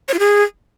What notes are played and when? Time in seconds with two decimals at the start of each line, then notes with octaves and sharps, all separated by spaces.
0.08 C#5
0.14 F4
0.19 G#4